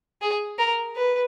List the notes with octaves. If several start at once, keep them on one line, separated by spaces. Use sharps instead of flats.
G#4
A#4
B4